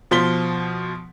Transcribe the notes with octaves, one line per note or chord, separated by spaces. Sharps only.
B2 F3 C6 B6 G7